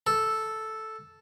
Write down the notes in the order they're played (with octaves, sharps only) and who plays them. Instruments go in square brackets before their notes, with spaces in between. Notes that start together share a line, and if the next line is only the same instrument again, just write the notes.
[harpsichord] A4